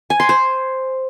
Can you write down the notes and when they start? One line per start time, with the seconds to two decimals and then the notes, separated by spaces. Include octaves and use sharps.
0.10 G#5
0.20 C6
0.29 C5